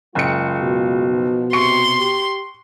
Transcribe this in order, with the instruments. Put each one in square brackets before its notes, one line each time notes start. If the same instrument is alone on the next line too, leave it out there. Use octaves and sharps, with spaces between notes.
[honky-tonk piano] F#1 C#7 [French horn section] G#3 F4
[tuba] B2
[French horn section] F3 B3 D#4
[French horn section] C3 [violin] C6 [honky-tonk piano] C#6 C#7
[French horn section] G4